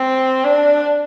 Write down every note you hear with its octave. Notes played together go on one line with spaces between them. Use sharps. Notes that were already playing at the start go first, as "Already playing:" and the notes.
Already playing: C4
D4